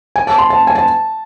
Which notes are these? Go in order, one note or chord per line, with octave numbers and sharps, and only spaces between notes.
G#5
A5
C6
A5
G#5
A5